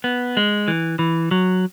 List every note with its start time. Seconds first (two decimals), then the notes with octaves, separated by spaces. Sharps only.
0.04 B3
0.37 G#3
0.68 E3
0.99 E3
1.31 F#3